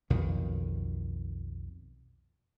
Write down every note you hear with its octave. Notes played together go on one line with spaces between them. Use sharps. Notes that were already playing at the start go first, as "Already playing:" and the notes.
B1 F2 B2 D#3